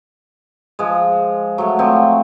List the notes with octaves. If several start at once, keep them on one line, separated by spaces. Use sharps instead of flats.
F3 G#3
F#3 A3
F3 F#3 C4